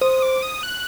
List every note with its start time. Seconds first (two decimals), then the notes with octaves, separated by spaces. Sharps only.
0.01 C5 D#6
0.22 D6
0.42 D#6
0.63 F#6